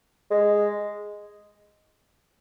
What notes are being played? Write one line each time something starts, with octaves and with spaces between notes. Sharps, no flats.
G#3